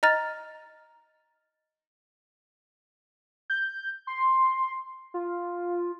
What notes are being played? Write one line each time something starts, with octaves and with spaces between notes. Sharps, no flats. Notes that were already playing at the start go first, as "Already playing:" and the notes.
D#5 A#5 F6 A6
G6
C6
F4